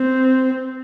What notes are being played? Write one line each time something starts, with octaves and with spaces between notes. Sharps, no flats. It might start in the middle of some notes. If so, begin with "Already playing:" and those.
Already playing: C4